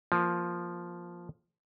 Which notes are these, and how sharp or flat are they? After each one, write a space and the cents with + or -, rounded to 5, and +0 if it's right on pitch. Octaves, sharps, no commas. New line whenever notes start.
F3 +0 A#3 +15